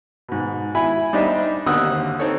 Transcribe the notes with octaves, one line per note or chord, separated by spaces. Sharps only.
G#2 B2
E4 G#5 B5
G3 D4 D#4 C5 D#5 E5
D#2 D3 C4 D#6 E6 F#6
C4 D#4 A4 C#5